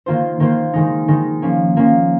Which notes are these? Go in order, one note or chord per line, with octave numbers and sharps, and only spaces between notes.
D#3 A#3 F4 C5
D#3 A#3 F4 C5
D#3 G#3 D#4
D#3 G#3 D#4
F3 A#3 C#4
F3 A#3 C#4